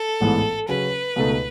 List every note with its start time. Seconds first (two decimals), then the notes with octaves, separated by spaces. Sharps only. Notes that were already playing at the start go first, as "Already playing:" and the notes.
Already playing: A4
0.20 A1 G#2 E3 B3
0.68 C#3 F#3 C#4 B4
1.16 C#2 B2 A3 D#4 A4